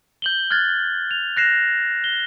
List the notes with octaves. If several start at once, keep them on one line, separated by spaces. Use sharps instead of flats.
G6 F#7 G7
F6 F#6 G#6 A6
F7
F#6 A#6 C7 E7
G7